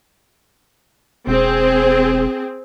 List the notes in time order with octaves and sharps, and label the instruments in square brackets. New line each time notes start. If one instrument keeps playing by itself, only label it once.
[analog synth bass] E1 [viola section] C4 G#4